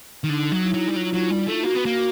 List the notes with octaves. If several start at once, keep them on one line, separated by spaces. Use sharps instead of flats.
D#3
D3 D#4
F#3 D#4
E4
F#3
G3
F#3 F4
F#3
G3
A3
A#3 F#4
B3
A#3